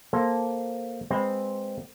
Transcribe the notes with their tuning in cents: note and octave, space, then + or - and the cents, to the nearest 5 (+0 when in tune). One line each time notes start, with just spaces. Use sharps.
A#3 +0 A4 -5 C5 +5
G#3 -10 C4 +0 B4 +0